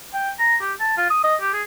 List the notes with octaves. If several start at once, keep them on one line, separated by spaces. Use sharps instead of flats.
G5
A#5
G4
A5
F4
D#6
D#5
G4
G#4